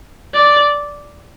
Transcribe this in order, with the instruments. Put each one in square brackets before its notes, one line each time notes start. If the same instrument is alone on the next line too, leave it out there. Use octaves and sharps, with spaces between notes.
[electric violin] D5